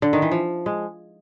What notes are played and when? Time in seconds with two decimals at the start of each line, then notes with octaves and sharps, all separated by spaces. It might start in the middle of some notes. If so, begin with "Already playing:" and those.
0.02 D3
0.13 D#3
0.22 E3
0.32 F3
0.66 G#3